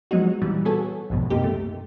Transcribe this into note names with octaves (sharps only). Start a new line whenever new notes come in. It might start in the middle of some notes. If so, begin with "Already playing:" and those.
F3 F#3 G#3 B3 D#4 F#4
A#2 E3 G3
B3 F#4 G#4 A4 C#5
C2 F2 G#2 B2
F#2 C3 A#3 D#4 G4
A3